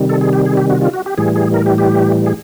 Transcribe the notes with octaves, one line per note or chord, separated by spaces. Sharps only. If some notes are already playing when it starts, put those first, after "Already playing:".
Already playing: C3 D#3 G3
A4
G#4
G4
G#4
G4
F#4
F4
F#4
G4
A2 E3 G3 G#4
G#4
A#4
G4
G4
G#4